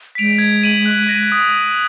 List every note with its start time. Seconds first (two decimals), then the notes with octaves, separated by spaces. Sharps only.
0.15 G#3 B6 D7 F7
0.38 G#6
0.62 B6 D#7 F#7
0.86 F#6
1.09 A#6 D#7
1.32 D#6